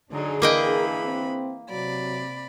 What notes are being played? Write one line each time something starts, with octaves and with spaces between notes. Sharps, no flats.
D3 F#3 D4 D#4 G#4
E3 A#3 A#4 D#5 G5 B5
C4
C3 F#3 D5 B5